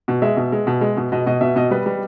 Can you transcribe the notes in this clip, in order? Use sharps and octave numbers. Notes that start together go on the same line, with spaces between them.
B2
G#3 E5
B2
G#3
B2
G#3
B2
B2 D#5
B2 D#5
B2 E5
B2 D#5
G3 B4
G3